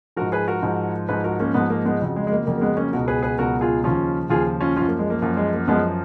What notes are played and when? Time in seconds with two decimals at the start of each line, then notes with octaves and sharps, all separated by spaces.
0.16 G#2 F3 F#4 A#4
0.32 G#4 B4
0.48 F#4 A#4
0.62 G#2 F3
1.09 G#2 F3 G#4 B4
1.24 F#4 A#4
1.40 A#3 C#4
1.54 G#2 F3 G#3 B3
1.70 A#3
1.85 G#3 B3
2.01 F2 C#3 F#3
2.16 G#3
2.27 G#3
2.31 A#3
2.46 F2 C#3 F#3 A#3
2.58 A#3
2.61 G#3 B3
2.77 A#3 C#4
2.92 C#2 B2 F#3 F#4 A#4
3.08 G#4 B4
3.23 G#4 B4
3.38 C#2 B2 F#3 F#4 A#4
3.61 F4 G#4
3.84 D#2 C#3 F3 C#4 F4
4.30 D#2 C#3 F3 F4 G#4
4.61 C#4 F4
4.76 F3 C#4 F4
4.80 F#2
4.88 A#3
4.99 G#3
5.10 A#3
5.22 F#2 F3 A#3
5.37 G#3
5.53 A#3
5.68 F#2 F3 G#3 B3